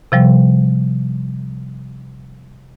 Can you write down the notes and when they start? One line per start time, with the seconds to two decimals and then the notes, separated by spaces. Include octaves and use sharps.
0.12 C3 F3 G3